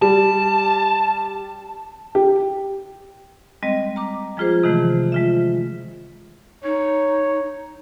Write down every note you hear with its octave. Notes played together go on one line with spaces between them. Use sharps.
G3 A5
G4
G3 G#3 C4 D#5
A#5 D6
F3 G#3 F4 G#4 C5
C3 D#3 E3 G#3 A3
G#3 F4 E5
D#4 C#5